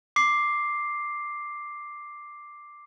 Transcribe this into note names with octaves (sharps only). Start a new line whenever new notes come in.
D6 C7